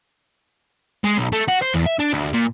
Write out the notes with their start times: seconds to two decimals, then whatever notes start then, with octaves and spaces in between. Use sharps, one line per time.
1.04 G#3
1.18 B1
1.32 A3
1.48 F#4
1.62 C5
1.74 E2
1.86 E5
1.99 D4
2.13 D2
2.33 A#2